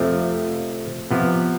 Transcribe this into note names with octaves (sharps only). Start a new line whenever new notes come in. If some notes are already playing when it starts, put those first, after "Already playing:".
Already playing: F2 C3 F3 A3
C3 F3 B3